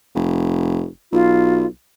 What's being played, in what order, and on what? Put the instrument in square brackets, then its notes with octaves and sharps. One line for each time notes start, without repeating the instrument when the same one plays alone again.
[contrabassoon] F1
[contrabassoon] B1 [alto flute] F4